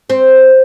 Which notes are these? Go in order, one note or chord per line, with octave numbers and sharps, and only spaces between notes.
C4